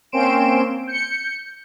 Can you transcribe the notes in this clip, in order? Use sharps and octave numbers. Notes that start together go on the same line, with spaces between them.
A#3 C4 C#4 C6 D7 E7
G6 C#7